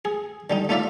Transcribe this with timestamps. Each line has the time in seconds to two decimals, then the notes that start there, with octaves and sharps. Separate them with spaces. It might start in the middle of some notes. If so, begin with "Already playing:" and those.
0.05 G#4
0.50 D3 G3 D#4
0.69 A3 D#4 F4 D5 E5 F5